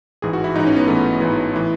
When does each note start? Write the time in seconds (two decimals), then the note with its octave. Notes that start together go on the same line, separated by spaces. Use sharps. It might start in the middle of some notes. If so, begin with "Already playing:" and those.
0.22 A1 G#2 E3 G#4
0.33 F#4
0.44 E4
0.55 A1 G#2 E3 D#4
0.67 C#4
0.76 B3
0.87 A1 G#2 E3 A3
1.20 A1 G#2 E3
1.54 A2 E3